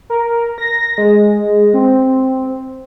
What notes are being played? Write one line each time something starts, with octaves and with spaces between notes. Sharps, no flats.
A#4
A#6
G#3
C4